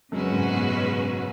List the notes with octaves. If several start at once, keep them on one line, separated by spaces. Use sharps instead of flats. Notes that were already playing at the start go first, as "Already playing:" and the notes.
F#2 C#3 G#3 C#4 F#4 B4
G#2
B2